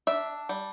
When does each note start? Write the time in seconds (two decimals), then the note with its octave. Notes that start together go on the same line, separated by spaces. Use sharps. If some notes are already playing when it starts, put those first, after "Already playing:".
0.07 D4 E5
0.49 G3